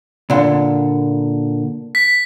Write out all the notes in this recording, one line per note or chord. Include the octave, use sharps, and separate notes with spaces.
A#2 D3
B6